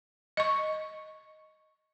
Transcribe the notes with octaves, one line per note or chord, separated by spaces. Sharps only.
D#5 C#6